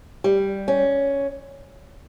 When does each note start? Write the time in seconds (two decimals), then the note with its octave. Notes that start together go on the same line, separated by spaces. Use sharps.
0.24 G3
0.68 C#4